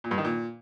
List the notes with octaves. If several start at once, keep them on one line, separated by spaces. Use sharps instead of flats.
A#2
G2
D#3
A#2